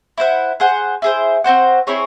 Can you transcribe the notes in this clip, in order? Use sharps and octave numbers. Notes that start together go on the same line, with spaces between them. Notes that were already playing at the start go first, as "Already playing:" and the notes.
E4 C5 F#5
G#4 C5 F#5
E4 G#4 C5
C4 F#4 C5 F#5
C4 E4 G#4 C#5